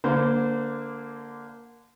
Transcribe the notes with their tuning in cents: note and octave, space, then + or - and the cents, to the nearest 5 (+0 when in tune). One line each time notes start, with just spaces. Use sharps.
D3 -20 A#3 +0 C5 -30